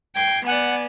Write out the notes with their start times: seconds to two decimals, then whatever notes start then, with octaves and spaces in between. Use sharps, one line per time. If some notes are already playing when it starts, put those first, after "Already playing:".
0.16 G5 G#6 C7
0.46 B3 D5 F#5 G#5